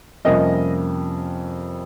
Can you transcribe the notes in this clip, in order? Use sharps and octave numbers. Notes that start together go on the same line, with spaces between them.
F2 C3 G3 A#3 C#4 D#5